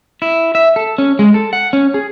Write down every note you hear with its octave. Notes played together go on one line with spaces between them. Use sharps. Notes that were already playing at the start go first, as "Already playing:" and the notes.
E4
E5
A4
C#4
G#3
A4
F#5
C#4
G#4